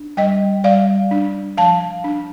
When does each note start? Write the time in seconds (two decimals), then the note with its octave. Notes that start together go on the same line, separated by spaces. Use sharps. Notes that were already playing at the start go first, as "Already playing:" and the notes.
Already playing: D4
0.17 G3 D#5 G5
0.64 G3 D5 F5
1.11 D4
1.57 F3 F5 A5
2.04 D4